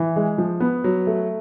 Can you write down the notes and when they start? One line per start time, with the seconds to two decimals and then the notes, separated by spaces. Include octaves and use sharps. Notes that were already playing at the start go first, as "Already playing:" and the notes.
Already playing: E3
0.16 G#3
0.38 F3
0.60 B3
0.84 F#3
1.07 A3